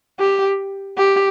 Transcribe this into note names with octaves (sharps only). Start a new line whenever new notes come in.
G4
G4